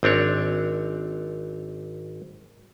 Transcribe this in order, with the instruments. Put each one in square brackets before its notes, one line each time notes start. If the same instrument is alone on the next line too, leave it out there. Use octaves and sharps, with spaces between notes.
[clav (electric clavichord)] G#1 C4 D4 C#5